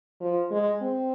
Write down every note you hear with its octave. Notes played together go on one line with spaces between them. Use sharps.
F3
G#3
C4